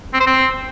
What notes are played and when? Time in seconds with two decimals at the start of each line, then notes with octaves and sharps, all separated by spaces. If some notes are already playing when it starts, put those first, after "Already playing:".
0.14 C4
0.20 C5
0.27 C4